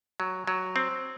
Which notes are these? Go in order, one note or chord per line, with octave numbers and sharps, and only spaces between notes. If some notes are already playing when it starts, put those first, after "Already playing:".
F#3
F#3
C4